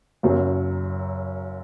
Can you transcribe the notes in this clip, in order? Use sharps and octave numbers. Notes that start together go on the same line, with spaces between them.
F#1 F#2 F#3